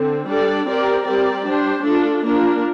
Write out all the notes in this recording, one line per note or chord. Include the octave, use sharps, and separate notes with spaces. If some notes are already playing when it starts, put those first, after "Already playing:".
Already playing: D3 C4
G3 D4 A4 D5
C4 G4 A#4 D5
G3 C4 G4 A#4 D5
G3 D4 G4 C5
A3 D4 F4 A4
A#3 D4 F4 A#4